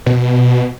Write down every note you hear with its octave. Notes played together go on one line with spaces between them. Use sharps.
B2